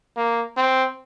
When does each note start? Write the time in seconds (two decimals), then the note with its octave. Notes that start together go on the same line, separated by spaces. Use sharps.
0.17 A#3
0.57 C4